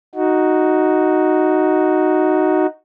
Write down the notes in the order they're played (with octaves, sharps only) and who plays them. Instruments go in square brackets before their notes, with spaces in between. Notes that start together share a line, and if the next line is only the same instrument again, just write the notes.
[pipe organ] D#4 F#4